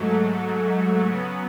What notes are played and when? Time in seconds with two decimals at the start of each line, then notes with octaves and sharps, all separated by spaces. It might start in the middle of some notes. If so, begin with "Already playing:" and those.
Already playing: G#2 F#3 A3
1.10 C#3 F#3 B3